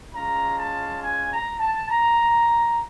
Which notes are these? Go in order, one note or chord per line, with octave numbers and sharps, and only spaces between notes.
G#3 C#4 F4 A#5
A5
G#5
A#5
A5
A#5